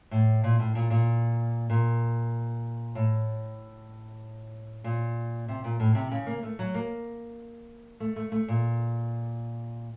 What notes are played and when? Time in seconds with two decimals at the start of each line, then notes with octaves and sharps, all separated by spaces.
0.11 A2
0.44 A#2
0.59 A2
0.75 A#2
0.90 A#2
1.70 A#2
2.95 A2
4.84 A#2
5.48 C3
5.64 A#2
5.80 A2
5.95 C3
6.11 C#3
6.26 A#3
6.43 A3
6.59 F#3
6.74 A#3
8.00 A3
8.16 A3
8.32 A3
8.48 A#2